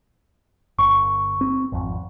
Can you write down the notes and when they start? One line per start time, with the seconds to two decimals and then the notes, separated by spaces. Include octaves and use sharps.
0.79 G1 C#6
1.41 C4
1.72 G#1 F2